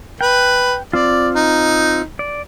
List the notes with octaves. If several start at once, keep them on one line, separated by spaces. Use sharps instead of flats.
B4 G5
C4 F4 D5
D#4
D5